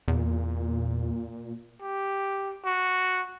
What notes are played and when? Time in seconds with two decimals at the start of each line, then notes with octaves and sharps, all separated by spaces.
0.08 E2 A#2
1.82 G4
2.65 F#4